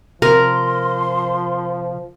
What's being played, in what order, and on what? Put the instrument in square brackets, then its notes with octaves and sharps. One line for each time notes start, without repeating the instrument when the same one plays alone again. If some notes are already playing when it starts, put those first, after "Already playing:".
[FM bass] C3 [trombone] F3 [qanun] A#4 [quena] C6